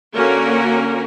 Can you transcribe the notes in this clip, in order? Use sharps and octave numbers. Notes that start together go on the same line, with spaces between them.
D3 A#3 C#4 F#4 A#4